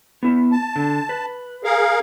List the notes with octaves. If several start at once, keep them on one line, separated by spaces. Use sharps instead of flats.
B3 E4
A5
D3
B4
G#4 A#4 F5